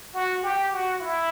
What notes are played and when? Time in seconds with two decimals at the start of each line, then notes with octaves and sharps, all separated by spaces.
0.14 F#4
0.43 G4
0.72 F#4
1.01 E4